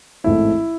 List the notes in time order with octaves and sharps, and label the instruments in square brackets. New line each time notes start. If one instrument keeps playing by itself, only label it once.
[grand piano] A1 G#2 E3 A3 C4 E4